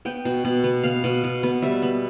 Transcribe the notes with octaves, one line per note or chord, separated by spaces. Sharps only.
B3 G5
B2
B2
B3
B3 F5
B2
B2
B3
G3 E5
B3